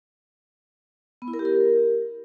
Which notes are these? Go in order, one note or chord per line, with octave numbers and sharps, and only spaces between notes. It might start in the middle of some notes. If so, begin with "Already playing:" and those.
B3
E4
A#4
G4
A#4